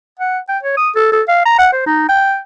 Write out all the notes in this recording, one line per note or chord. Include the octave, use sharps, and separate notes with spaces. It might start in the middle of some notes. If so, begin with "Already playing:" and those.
F#5
G5
C#5
D#6
A4
A4
F5
A#5
F#5
C5
D#4
G5